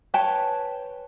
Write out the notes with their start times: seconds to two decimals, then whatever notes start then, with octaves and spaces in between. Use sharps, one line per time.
0.14 B4 C#5 G5 A5